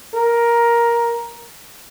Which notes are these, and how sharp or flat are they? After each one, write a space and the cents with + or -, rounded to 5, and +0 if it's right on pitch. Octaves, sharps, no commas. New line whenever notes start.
A#4 +10